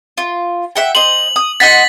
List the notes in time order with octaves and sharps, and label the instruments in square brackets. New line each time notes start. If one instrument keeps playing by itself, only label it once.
[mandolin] F4
E5 F#5 G5
[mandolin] C5 D#5 [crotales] F#7
[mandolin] D#6
[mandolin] D#4 F#5 C6 [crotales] A6 B6